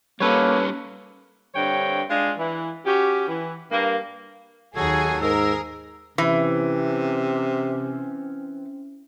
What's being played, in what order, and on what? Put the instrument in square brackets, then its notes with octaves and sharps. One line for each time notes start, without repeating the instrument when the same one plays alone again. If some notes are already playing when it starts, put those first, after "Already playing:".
[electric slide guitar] G3 C#4 [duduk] A#3 [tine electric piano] A4 B4 C#5
[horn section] G2 D3 C4 C#5 G5
G#3 D4 F4
E3
C#4 F#4 G4
E3
G2 A#3
[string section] D#2 G#4 [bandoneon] F#3 F#4 A4 [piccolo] G#6
[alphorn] G#2 [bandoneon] G#4 [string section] A#4 [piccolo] E6
[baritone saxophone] C3 [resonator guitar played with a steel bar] E3 [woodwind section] C4 C#4